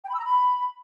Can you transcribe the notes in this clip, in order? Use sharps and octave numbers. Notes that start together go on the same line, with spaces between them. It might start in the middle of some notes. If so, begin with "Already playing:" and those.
G5
B5
E6
A#5
B5